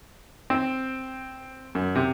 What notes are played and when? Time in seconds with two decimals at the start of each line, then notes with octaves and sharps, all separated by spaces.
0.50 C4
1.75 F#2
1.95 C3